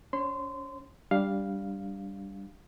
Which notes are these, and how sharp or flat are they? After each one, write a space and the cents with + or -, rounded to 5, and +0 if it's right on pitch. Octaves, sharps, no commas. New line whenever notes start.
C#4 +40 C#5 -45 C6 -25
G3 +0 D4 -10 F5 +0